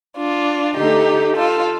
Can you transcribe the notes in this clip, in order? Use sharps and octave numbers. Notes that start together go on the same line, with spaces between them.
D4 F4
D3 A3 D#4 G4
F4 A4